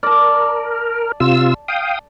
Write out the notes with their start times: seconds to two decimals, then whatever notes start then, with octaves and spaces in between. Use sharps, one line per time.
0.03 A#4 D5 A5
1.20 C3 F4 E6
1.68 F5 G5 D#6